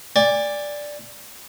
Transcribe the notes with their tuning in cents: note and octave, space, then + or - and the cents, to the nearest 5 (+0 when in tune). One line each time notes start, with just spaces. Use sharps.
D5 +0 G#5 -35